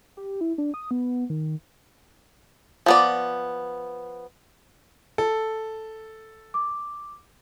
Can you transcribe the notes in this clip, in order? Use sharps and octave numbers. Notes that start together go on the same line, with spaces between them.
G4
E4
D4
D#6
B3
D#3
F3 B3 D5
A4
D6